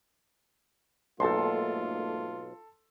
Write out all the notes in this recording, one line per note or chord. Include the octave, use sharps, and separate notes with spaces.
B1 G#2 A3 A#3 F4 A4 A5 C6